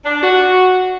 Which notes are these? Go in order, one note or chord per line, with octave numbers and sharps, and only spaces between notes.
D4
F#4